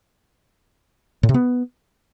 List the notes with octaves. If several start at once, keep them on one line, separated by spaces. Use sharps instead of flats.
A2
C3
B3